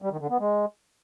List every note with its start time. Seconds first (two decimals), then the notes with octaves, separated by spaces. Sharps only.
0.02 G3
0.11 D#3
0.21 D3
0.30 B3
0.39 G#3